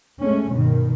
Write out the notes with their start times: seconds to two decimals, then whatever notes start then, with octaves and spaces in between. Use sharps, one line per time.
0.21 G#3 A3 C#4
0.52 G2 B2 D#3